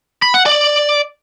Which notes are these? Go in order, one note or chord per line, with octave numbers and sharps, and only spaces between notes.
B5
F#5
D5